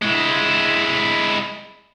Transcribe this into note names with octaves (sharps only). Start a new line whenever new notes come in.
G#3 E4